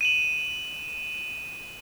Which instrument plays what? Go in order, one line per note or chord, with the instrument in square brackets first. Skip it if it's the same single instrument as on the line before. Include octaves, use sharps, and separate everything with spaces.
[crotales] D#7 E7 F#7